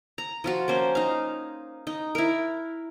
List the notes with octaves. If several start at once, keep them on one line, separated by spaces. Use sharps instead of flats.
A#5
F3 F4 F#4
A#3 C#4 C5
D#4 F5
D#4
E4 A#4